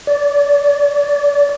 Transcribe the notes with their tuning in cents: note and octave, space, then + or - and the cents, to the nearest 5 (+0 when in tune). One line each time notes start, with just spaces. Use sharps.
D5 -25